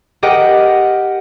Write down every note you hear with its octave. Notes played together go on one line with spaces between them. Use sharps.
G4 A#4 D#5 F#5 G5